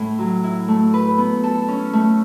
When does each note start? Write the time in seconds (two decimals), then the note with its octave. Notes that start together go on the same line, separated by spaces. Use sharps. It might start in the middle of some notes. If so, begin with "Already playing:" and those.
Already playing: A2
0.19 F#3
0.44 E4
0.68 A3
0.94 B4
1.18 B3
1.44 A4
1.68 C#4
1.93 A3